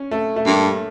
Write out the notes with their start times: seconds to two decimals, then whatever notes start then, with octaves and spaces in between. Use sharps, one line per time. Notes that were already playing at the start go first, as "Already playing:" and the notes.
Already playing: C#4
0.11 A3
0.36 A3
0.45 G2 A#3